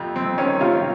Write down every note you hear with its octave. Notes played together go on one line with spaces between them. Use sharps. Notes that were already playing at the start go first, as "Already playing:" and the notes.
Already playing: F2 C3
F2 C4
D#3 C#4
C3 F4